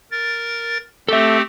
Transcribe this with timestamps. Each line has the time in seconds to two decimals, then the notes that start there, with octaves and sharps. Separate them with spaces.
0.11 A#4 A6
1.08 A3 C4 G4 A4 E5